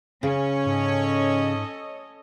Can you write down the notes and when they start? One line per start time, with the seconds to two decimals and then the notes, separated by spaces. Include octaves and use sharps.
0.23 C#3 C#4 C#5
0.66 G#2 A4 D#5